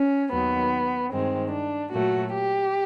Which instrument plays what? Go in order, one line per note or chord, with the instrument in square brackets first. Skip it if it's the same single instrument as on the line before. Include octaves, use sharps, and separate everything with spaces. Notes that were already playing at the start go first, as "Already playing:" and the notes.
Already playing: [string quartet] C#4
D#2 D#3 F#3 B3
G2 D#3 G#3 C4
D4
A#2 F#3 A3 F#4
G4